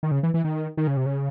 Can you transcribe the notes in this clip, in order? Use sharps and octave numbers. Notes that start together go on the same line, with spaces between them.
D#3
C#3
E3
E3
D#3
D#3
C#3
C3
C#3